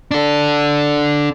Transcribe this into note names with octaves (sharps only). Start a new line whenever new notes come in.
D4 A4